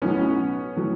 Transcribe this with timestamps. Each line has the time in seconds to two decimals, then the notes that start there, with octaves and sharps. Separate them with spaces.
0.02 B1 A2 F#3 B3 C#4
0.76 A2 F#3